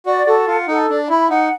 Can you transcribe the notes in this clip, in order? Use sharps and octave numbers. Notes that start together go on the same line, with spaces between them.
F#4 D5
F#4 A4
F4 F#5
D#4 A4
D4 D5
E4 B5
D#4 F#5